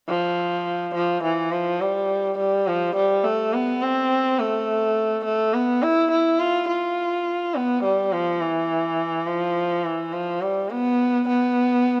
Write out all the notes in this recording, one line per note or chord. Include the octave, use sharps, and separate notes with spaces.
F3
F3
E3
F3
G3
G3
F3
G3
A3
B3
C4
A3
A3
B3
E4
E4
F4
F4
B3
G3
F3
E3
F3
E3
F3
G3
B3
B3